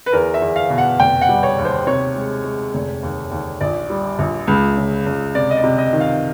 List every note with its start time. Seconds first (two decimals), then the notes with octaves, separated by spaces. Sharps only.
0.06 B4
0.12 E2 A#4
0.34 E5
0.42 E2
0.56 F5
0.70 B2
0.78 F#5
0.99 F1 G5
1.21 F#5
1.29 G3
1.43 C#5
1.58 D#2
1.65 C5
1.87 C3 C#5
2.15 G#3
2.44 G#3
2.74 F1
3.03 D#2
3.31 D#2
3.61 A#1 D5
3.90 G3
4.19 A#1
4.47 C#2
4.77 C#3
5.06 C#2
5.35 C3 D5
5.51 D#5
5.57 D5
5.64 C3
5.78 D#5
5.93 D#3
6.00 F5